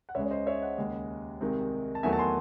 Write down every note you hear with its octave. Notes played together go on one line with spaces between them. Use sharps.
F#5
C#2 C#3 G#3 C#5 E5
C#5
C5 D#5
C#5 E5
D#5 F#5
D#2 C#3 G#3
C2 C3 D#3 G#3
A5
E2 D#3 F#3 A3 E5 G#5
A5
G#5 C6